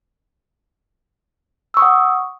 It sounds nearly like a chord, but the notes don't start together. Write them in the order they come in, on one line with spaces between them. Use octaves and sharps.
E6 C#6 D#6 F#5